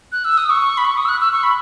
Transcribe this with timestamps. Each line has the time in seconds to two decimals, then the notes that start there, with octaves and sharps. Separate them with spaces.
0.12 F#6
0.25 E6
0.38 D#6
0.50 C#6
0.78 B5
0.85 C#6
0.98 D#6
1.05 E6
1.09 F#6
1.20 E6
1.33 C#6
1.43 B5